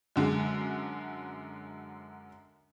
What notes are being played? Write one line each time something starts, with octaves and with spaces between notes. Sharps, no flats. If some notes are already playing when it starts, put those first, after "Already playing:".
F#2 D3 G#3